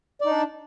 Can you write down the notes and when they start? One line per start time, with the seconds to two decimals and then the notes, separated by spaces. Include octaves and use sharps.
0.21 D5
0.25 D#4
0.30 D4